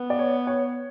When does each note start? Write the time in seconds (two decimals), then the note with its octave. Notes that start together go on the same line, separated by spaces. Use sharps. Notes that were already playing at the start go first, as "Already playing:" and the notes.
Already playing: B3
0.10 D5
0.19 C#5
0.47 C#5